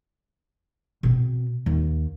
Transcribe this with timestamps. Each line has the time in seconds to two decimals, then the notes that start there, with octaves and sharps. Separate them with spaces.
1.03 B2 C4
1.66 D#2